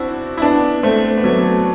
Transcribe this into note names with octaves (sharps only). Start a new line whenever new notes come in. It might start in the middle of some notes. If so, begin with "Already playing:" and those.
Already playing: C4 D4 E4 F#4
E4
B3 D4
A3 C4
B3
F#3 A3